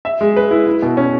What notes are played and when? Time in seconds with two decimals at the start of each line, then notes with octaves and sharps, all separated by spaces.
0.05 E5
0.21 G#3
0.36 B4
0.51 E4
0.66 E4
0.83 B2
0.97 C#4